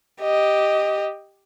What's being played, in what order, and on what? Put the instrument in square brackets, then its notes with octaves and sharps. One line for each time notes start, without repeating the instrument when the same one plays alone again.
[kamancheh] G4 D#5